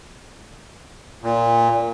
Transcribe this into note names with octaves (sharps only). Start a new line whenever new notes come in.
A#2